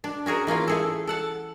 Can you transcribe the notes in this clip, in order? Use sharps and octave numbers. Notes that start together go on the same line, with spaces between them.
D4
C#4 F#4 G#4 A#4
E3 A#3 C#4 F4
A3 G#4 A4
A4 F#5 A5